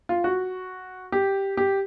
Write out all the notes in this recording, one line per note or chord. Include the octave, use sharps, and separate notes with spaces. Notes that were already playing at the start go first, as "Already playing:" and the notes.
F4
F#4
G4
G4